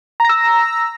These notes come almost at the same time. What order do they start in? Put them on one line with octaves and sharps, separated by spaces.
A#5 A#6 E6